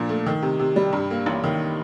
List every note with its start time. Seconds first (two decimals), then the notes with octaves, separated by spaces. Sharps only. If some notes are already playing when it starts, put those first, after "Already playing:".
Already playing: A#2 F3 D4
0.09 A3
0.26 D#3
0.42 C3
0.59 C3
0.76 G3
0.93 G2
1.11 A#3
1.26 A1
1.44 D#3